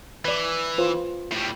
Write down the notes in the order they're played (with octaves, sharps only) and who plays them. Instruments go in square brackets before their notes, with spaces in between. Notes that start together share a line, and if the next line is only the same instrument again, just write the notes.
[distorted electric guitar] E3 [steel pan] B4 D5
[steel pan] F4 B4 C5
[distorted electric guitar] A2 G3